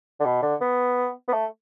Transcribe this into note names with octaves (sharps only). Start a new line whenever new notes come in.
D3
B2
D3
B3
B3
A3